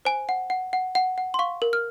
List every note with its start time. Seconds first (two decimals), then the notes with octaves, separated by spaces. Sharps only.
0.05 C5 G#5
0.29 F#5
0.50 F#5
0.73 F#5
0.95 F#5
1.18 F#5
1.34 C6
1.39 F5 C#6
1.62 A#4
1.73 F6